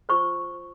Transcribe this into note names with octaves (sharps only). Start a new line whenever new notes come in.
F4 C5 C#6